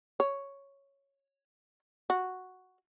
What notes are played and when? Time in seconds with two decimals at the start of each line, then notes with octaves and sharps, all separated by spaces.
0.20 C#5
2.10 F#4